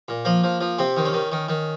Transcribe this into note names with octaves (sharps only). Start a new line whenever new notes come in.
A#2
F3 A#3
F3
F3
C3 C4
D#3
C#4
D#3
D#3
D#3